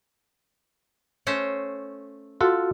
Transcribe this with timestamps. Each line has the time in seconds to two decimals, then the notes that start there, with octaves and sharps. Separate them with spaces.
1.27 A3 C#4 C5
2.41 F4 F#4 A4 F#5